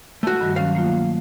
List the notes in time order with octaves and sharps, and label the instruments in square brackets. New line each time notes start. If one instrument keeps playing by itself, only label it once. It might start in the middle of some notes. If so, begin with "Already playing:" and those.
[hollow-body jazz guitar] A3 F#4
[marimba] G2 D#3 G3
[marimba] D#3 F#3 C#4 [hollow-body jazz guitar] F5
[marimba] A3 A#3 F4